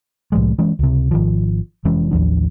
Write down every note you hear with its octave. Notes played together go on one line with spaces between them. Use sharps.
C2 A2 F3 G#3
E3 G#3 C#4
C#2 C3
G#1 D#3 F3
F1 E3 G#3 C#4
A1 D#2 F3 D4